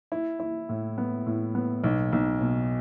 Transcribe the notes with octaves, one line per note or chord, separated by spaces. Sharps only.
E4
E4
A2
B3
A2
B3
B1
B1
B2